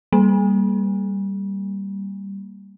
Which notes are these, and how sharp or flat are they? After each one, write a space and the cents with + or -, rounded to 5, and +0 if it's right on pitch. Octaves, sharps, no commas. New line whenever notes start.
G3 +0 A#3 -10